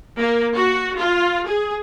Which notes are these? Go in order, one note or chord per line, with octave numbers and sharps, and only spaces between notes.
A#3
F#4
F4
G#4